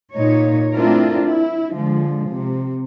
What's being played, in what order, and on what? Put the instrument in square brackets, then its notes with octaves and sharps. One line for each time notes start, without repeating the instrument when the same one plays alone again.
[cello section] A#2 D#4 C#5
A3 C4 D4 E4 F4 A#4
E4
D3 F3 G#3
C3